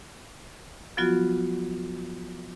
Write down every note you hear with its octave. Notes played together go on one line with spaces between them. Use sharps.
F3 F#3 B3 F4 F#4